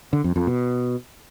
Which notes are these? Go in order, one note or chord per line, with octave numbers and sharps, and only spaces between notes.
D3
F2
F2
B2